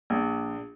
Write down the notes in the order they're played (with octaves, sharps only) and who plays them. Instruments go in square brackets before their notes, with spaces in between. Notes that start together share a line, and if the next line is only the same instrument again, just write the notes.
[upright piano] A#1